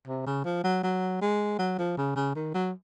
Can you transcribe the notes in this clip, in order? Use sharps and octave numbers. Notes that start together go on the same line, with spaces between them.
C3
C#3
F3
F#3
F#3
G#3
F#3
F3
C#3
C#3
D#3
F#3